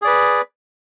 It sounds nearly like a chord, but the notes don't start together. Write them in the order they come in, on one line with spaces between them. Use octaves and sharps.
G#4 D5 B4